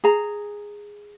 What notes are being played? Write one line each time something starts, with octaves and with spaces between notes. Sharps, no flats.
G#4 A#5